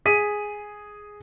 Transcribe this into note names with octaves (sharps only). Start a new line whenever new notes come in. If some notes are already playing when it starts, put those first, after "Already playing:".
G#4 B6 D#7